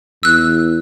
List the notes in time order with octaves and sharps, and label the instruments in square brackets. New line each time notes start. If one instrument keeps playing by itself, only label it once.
[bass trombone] E2 [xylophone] E6 F#6